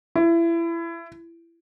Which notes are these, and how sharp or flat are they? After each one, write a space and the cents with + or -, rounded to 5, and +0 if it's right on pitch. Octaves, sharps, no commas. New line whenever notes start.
E4 +25